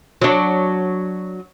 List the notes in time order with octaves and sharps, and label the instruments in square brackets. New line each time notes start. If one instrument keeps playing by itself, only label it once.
[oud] F#3 D4